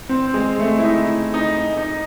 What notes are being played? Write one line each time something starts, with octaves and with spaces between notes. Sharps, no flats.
C4
G#3
A3
E4
D#4
D#4
D#4